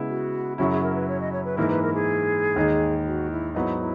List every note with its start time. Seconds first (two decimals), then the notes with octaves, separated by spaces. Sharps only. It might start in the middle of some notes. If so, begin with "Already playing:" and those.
Already playing: C#3 G#3 B3 E4
0.09 F#4
0.58 F#2 C#3 F#3 C#4 E4 F#4
0.71 G#4
0.83 A#4
0.95 B4
1.08 C#5
1.21 D#5
1.32 C#5
1.45 B4
1.57 G#2 E3 A#3 E4 A#4
1.69 B4
1.83 A#4
1.94 G#4
2.56 D#2 D#3 G#3 D#4
3.06 F#4
3.31 E4
3.55 G#2 F#3 B3 D#4 E4
3.80 E4